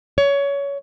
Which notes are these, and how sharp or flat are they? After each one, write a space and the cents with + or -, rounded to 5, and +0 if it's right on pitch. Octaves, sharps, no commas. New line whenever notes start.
C#5 +20